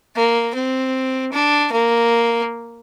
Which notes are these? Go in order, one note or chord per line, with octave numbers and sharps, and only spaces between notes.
A#3
C4
D4
A#3